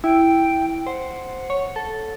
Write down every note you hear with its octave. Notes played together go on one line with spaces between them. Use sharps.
E4 G5
C5 F#5
C#5
A4